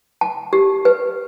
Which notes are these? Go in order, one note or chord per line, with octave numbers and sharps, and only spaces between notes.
A5
G4
B4